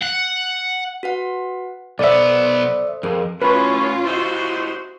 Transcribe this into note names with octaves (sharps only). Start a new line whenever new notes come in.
F#5
F#4 B4 F#5
B1 B3 A4 C5 D5 E5
F2 G#4 A#4
A2 C#4 F4 F#4 B4
E4 F#4 G4 C5 D#5